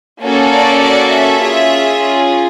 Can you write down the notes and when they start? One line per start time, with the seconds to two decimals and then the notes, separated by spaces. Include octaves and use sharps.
0.23 A#3 C#4 F#4 A4
0.53 D5
0.82 D5
1.13 E5
1.43 C#4 F4 G#4